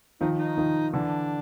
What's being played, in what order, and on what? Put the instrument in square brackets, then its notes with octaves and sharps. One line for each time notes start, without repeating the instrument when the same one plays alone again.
[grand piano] D#3 F3 [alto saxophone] D#4
[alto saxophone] D#4
[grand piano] D#3 F3
[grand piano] D3 E3 [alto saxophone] D4